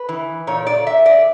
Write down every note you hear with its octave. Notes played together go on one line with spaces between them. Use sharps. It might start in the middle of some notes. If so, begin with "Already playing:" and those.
Already playing: B4
E3
A#2 C#5
D5
E5
D5